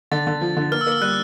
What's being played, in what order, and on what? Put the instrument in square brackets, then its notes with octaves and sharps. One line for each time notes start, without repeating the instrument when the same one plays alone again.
[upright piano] D3 [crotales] A6
[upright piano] D3
F3
D3
[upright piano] A#3 [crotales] F6
[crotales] E6
[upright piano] A#3
[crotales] F6
[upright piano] G3 [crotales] F#6